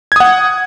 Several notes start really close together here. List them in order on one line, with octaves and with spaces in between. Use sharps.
G#6 D#6 F#5